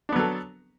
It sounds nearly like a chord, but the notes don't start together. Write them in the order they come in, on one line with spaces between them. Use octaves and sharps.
D4 B3 F#3 A4